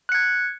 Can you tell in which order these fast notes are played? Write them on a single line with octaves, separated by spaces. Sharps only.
F#6 C#7 G#6